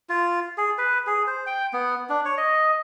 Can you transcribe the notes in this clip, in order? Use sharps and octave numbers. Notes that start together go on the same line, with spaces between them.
F4
G#4
B4
G#4
C5
G5
B3
D4
C#5
D#5